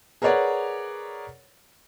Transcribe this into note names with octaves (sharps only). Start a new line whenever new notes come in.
G#4 A#4 B4 C#5 D5 F#5